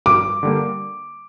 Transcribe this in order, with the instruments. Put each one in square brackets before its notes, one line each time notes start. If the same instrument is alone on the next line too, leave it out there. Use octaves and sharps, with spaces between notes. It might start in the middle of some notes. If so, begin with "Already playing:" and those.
[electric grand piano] G2 [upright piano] D6
[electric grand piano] D3 G3 A#3